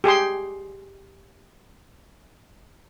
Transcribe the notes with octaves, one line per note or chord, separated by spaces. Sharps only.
G4 G#4 G5 C6